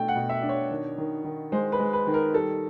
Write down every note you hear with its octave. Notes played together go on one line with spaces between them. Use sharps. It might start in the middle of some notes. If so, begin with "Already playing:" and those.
Already playing: B2 A3 D4 G5
F#5
B2
E5
D4
C#5
D#3
D#3
D#3
G#3 C5
B4
G#3
B4
D#3
A#4
G3 A4